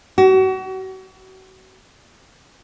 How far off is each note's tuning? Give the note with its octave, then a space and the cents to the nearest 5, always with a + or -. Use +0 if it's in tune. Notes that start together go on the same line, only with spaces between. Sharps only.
F#4 +35